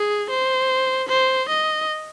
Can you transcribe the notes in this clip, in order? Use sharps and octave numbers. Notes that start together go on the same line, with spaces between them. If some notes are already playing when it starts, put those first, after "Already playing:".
Already playing: G#4
C5
C5
D#5